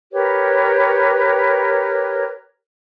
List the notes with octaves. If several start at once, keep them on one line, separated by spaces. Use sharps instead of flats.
G4 A#4 B4 C#5